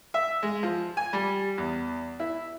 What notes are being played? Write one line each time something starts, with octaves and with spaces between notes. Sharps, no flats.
E5
G#3
F3
G#5
G3
E2
E4